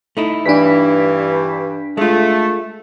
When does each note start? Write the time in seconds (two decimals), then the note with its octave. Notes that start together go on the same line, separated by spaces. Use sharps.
0.17 A3 D#4 E4
0.46 G2 E3 D4 B6
1.97 G#3 A3 F4